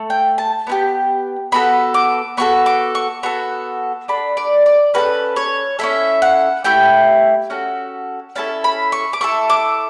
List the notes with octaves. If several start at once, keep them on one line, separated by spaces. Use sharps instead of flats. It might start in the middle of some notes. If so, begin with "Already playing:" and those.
Already playing: A3 A4
G5
A5
B3 E4 G4
B3 F#4 A4 B5
D6
B3 F#4 A4 C#6
D6
C#6
B3 F#4 A4 C#6
D4 A4 B5
D5
D5
C#4 F#4 A4 B4
C#5
C#4 E4 A4 E5
F#5
A3 E4 G4 G5
C#4 F#4 A4
C#4 E4 A4 A5
B5
C#6
D6
A3 E4 A4 C#6
D6